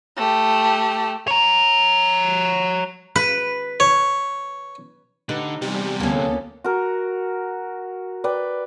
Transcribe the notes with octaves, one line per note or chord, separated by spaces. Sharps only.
A3 G4
C#5 A#5
B4
C#5
D3 D#4 G4 B4
E2 C3 G3
D2 A#3 B3 C#4 A4
F#4 A#4
B4 D5 G5